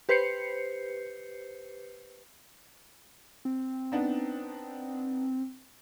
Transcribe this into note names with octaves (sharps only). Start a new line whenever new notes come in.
G4 B4 C5 G6 C7 C#7
C4
B3 D4 D#4